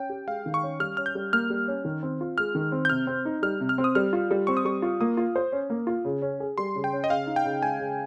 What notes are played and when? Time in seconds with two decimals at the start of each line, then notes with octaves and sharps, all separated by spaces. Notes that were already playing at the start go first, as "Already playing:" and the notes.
Already playing: C#4 G5
0.10 G4
0.27 G#3 F5
0.46 D#3
0.54 C#6
0.63 C#4
0.80 G3 F6
0.97 C#4 F6
1.06 G6
1.15 G3
1.33 A#3 F6
1.50 G3
1.68 C#4
1.85 D#3
2.03 C4
2.21 F4
2.38 G#3 F6
2.55 D#3
2.72 C4
2.85 G6
2.90 C3 F6
3.07 C4
3.25 D#4
3.42 G3 F6
3.60 C3
3.69 F6
3.78 C4
3.84 D#6
3.95 G3 F6
4.13 F4
4.31 G3
4.47 C4 C#6
4.57 D#6
4.65 G3 C#6
4.82 F4
5.01 A#3 D#6
5.17 F4
5.36 C5
5.52 C#4
5.70 A#3
5.87 F4
6.05 C#3
6.22 C#4
6.40 G#4
6.58 G3 C6
6.75 C#3
6.84 G5
6.93 C#4
7.04 D#5
7.10 C#3 F5
7.27 D#4
7.36 G5
7.45 C#3
7.62 G#3 G#5
7.80 C#3